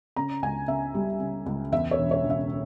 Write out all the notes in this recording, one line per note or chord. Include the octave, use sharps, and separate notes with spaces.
C#3 A#5
C#2 G#5
C#3 E5
G3
C#3
C#2
E2 E5
C#5
E1
C#5
E1
E5